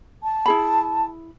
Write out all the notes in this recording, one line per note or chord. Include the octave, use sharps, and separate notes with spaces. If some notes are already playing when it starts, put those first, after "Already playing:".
A5
E4 G#4 B5